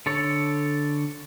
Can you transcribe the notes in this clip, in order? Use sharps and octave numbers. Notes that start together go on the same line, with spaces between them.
D3 A4 C#5